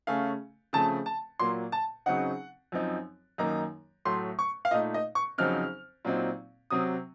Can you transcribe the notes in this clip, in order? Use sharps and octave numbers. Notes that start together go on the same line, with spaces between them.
C#3 A3 C#4 F5
C#3 F3 A3 C4 A5
A5
A#2 F#3 A#3 C6
A5
C#3 F#3 C4 D#4 F#5
F#2 F3 C4 D#4
F#2 D#3 A#3 D#4 A#5
A2 F#3 A3 C6
C#6
F5
A#2 A3 D#4 D#5
D#5
C#6
F2 C#3 F#3 C4 D#4 F6
A#2 F#3 C4 D#4
C3 F#3 C4 D#6